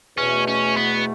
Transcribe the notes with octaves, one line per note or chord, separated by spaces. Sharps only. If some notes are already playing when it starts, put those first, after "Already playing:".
E2 B2 A3 C#4
C#4
B3